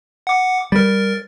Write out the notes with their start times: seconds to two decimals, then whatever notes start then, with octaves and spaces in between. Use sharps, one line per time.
0.27 F#5 D6
0.72 G3 A#4 A6